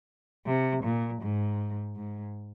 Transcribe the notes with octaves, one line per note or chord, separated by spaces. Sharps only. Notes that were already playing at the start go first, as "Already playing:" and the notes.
C3
A#2
G#2
G#2